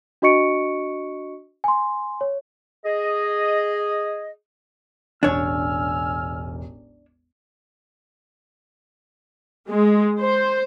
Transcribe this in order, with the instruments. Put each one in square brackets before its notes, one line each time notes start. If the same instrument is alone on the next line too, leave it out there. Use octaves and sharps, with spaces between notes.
[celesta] D4 F#4 D#5 C#6 C#7 D7
G#5 C6
C#5
[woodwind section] G#4 D#5
[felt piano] E1 A1 [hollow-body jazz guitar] D4 C#5 [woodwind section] G#5 E6 F6
[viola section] G#3
C5